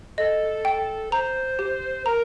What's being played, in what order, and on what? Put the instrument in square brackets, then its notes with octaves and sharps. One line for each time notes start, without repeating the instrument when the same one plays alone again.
[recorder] A4 [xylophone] D#5
[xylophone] G5
[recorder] C5 [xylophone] A#5
[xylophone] G4
[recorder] A#4 [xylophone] A#5